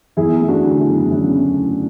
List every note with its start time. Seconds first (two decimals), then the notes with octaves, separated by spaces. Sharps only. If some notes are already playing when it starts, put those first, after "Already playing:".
0.17 E2 E4 G#4
0.40 A3
0.48 D4 F#4
0.64 D3
0.79 E4 G#4
0.87 F#1
1.10 E2 C#4 E4
1.33 A3